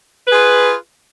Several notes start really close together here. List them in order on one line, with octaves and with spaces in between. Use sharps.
B4 G#4 F4